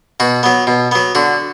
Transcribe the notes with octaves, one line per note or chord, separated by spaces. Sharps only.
B2 F#4
F#3 B3
B2
F#3 B3
D3 F#4